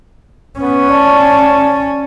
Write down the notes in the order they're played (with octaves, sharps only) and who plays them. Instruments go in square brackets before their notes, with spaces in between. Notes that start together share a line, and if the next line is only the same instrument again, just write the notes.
[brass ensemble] B3 [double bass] C#4
[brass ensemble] A2 D5 A5